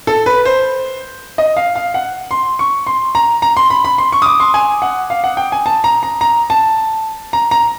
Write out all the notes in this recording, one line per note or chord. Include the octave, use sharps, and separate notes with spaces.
A4
B4
C5
D#5
F5
F5
F#5
C6
C#6
C6
A#5
A#5
C6
B5
B5
C6
C#6
D#6
D6
C6
G#5
F#5
F5
F#5
G5
G#5
A5
A#5
A#5
A#5
A5
A#5
A#5